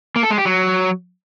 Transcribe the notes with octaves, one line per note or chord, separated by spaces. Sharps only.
A#3
A4
G#3
G4
F#3